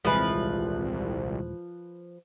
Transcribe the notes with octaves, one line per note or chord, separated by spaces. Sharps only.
D#1 C2 E3 F3 G#3 B4